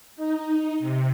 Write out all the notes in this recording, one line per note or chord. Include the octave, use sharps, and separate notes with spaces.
D#4
C3